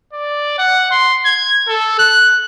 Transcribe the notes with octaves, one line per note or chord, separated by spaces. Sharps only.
D5
F#5
C6
G#6
A4
F#6